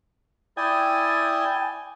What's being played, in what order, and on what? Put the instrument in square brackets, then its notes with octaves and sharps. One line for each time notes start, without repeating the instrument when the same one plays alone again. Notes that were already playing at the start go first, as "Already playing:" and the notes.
[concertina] E4 D5 D#6 [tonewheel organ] G5 G#5